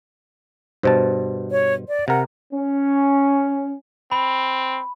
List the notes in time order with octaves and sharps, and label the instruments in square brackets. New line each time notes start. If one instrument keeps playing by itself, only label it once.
[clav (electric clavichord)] G2 B2 A5 [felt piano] C5
[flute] C#5
D5
[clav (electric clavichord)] C3 A#4 [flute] F#5
[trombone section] C#4
[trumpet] C4 [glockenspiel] B5